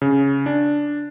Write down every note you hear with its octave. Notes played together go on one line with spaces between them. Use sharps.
C#3
D4